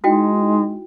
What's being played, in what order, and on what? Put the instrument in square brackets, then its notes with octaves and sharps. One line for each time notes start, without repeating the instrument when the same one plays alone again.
[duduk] G#3 [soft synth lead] D#4 [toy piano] E4 F#4 G5